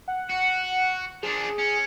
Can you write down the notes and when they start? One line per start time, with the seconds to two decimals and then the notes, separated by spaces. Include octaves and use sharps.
0.08 F#5
0.30 F#4
1.23 F3 D4 G#4
1.58 C#4